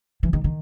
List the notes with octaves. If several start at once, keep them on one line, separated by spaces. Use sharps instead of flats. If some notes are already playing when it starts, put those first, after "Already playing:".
E3
D#3
D#3